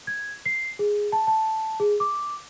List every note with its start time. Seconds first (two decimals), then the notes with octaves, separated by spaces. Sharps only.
0.07 G#6
0.46 C7
0.79 G#4
1.12 A5
1.27 A5
1.80 G#4
2.00 D6